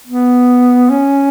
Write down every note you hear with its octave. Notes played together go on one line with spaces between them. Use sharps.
B3
C#4